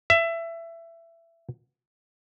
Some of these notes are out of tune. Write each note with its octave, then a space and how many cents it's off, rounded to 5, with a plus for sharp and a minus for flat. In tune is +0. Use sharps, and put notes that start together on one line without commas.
E5 +20